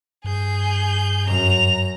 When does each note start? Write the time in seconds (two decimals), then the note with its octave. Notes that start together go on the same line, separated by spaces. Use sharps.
0.24 G2 G#4 G6
1.27 F#2 A#5 F7